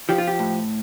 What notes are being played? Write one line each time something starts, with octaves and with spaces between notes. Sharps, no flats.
F3 G4
F4
G4
A2